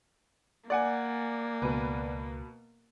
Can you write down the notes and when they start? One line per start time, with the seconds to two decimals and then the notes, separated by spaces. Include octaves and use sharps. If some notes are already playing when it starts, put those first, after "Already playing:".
0.70 A#3 D5 F#5 G#5
1.62 C#2 B2 B4